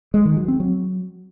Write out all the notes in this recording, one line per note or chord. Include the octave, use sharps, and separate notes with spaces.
G#3
D#3
F#3
C4
F#3